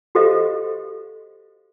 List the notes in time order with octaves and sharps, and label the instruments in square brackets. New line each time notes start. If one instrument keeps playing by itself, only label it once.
[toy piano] F#4 G4 A4 C5 D#5 F5